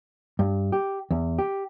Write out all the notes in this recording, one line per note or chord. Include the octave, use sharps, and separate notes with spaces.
G2
G4
E2
G4